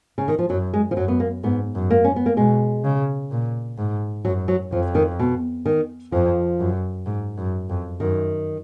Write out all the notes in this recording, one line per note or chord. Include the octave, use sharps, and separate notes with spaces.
C#3
D#3
F3
F#2 F#3
G#3
F3
F#2 F#3
B3
A#3
G#2 B3
F#2
A#3
C#4
B3
A#3
B2 G#3
C#3
A#2
G#2
F#2 F#3
F#3
F2 F3
D#3
B2
D#3
F2 F3
F#2
G#2
F#2
F2
F#2 D#3